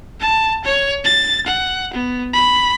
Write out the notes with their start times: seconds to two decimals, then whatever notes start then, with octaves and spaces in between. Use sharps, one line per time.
0.20 A5
0.65 C#5
1.04 A6
1.47 F#5
1.93 B3
2.34 B5